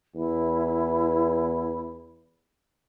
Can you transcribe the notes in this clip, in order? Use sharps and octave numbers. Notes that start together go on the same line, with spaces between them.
E2 E4